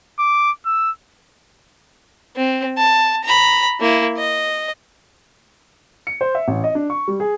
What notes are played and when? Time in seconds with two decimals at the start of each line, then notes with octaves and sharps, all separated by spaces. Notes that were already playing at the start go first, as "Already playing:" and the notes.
0.19 D6
0.66 E6
2.36 C4
2.77 A5
3.24 A#5 B5
3.80 A#3 E4
4.17 D#5
6.07 C#7
6.21 C5
6.35 E5
6.48 A1
6.64 D#5
6.75 D4
6.90 C#6
7.08 G3
7.20 G#4